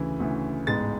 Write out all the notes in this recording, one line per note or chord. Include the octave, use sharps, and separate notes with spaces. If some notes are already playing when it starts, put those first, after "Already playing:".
Already playing: D2 C#3 E3
D2 C#3 E3
A1 G#2 G#3 B3 A6